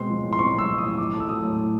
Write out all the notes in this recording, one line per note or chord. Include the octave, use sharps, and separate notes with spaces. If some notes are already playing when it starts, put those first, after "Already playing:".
Already playing: B2 G#3 C4 C6
F3
A2
C6
C4 C#6
G#3 E6
F3
D#6
A2
A2 D6
A3
E6
F#3 D#6
A2
A2